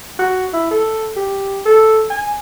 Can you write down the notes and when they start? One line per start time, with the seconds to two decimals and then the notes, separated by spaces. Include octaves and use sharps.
0.19 F#4
0.54 E4
0.71 A4
1.16 G4
1.65 A4
2.10 G#5